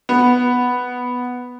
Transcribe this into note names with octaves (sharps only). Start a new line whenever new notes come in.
B3